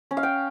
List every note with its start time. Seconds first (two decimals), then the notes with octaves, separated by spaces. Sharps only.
0.11 C#4
0.17 F5
0.23 G5